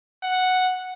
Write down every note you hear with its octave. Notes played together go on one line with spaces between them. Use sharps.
F#5